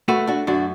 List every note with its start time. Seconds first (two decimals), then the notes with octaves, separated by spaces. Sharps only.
0.08 A3 F#4 B4
0.27 D4 F#4
0.47 F#2 D4 F#4